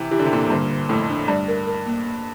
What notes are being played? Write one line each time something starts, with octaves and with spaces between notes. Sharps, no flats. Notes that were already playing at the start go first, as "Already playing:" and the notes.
Already playing: C3 E3
E3 G4
D3
C3
A#2 D3 D4
C3
G2 A#2 D3
D3
F2 A2 A3
D4
G2 D5
A#4
A#4
A#3
A#3